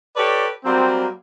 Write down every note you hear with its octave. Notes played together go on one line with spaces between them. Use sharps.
G4 A4 B4 C#5 D5
F#3 G3 A#3 C4